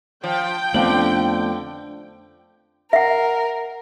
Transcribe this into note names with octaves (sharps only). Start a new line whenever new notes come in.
F3 G5
F2 D3 A3 B3 C#4 F5 F#7
A#4 E5 F#5